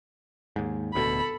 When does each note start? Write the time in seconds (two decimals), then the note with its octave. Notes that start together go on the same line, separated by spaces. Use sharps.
0.56 D#2 G#2
0.94 D1 D2 B2 A4 B5